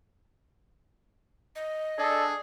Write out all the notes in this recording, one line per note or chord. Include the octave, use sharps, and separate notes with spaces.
D#5
D4 G#4 A4